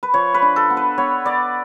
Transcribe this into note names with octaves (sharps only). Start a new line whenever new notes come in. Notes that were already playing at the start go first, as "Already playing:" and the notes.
B4
F3 C#5
B4
D4
A4
B3
B4
B3 C#5
B3 D5